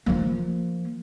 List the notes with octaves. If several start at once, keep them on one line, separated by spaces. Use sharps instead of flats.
F3 A#3